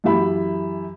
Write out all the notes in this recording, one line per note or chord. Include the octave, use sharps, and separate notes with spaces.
F#2 E3 G4 E5 B5